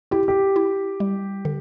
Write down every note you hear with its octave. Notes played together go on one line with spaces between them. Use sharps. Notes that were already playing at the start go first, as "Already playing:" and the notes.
E4 G4
G4
E4
G3
D3